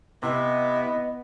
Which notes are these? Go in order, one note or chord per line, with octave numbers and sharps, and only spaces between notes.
C3 B3 E4 D#5